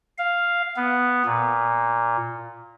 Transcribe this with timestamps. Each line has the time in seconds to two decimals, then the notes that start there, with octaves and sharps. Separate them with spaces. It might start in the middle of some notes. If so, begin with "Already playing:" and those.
0.18 F5
0.76 B3
1.26 A#2